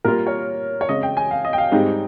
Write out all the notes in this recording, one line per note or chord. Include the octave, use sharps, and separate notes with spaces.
A#2 G3 A#3 F4 A#4
C#5
C#5
C#3 G#3 C4 D#5
G5
G#5
F5
D#5
G5
F5
G#2 G3 C4 D#4 G#4 G5